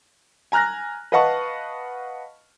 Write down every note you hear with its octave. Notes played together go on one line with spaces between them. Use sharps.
G#5 A#5 F6 F#6 A#6
B4 D#5 F5 F#5 A5 C#6